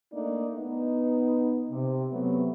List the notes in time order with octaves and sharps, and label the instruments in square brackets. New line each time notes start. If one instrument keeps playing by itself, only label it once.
[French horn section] A3 A#3 D4 D#4 D5
B3 D#4
C3
C3 F#3 A3 B3